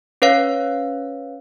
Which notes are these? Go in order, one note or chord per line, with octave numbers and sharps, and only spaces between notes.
C#4 B4 C#5 F5